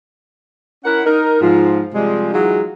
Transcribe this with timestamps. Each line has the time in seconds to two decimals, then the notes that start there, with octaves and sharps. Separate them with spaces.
0.84 C#4 E4 A#4 F#5
1.04 D#4 A#4
1.40 G#2 F3 F4
1.93 C3 F3 G3 G#3
2.33 E3 F#3 G#3 D#4 F4 G#4